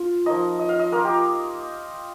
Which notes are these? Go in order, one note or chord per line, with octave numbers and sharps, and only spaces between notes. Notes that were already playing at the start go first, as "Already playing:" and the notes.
Already playing: F4 F5
F3 A#3 D#4 D#5
D#5
F5
D#5
A#3 F4 A#4
G4